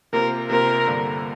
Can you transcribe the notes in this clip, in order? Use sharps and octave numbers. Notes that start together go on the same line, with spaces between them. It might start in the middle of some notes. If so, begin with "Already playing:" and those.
C3 A#3 F4 A#4 C5
C3 A#3 F4 A#4 C5
G2 D3 A#3